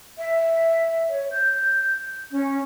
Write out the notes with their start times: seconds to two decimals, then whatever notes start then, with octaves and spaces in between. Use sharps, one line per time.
0.18 E5
1.09 C#5
1.31 G6
2.31 C#4